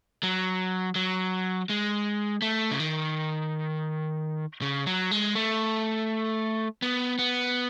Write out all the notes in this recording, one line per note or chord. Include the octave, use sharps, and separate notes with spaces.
F#3
F#3
G#3
A3
C#3
D#3
C#3
F#3
G#3
A3
B3
B3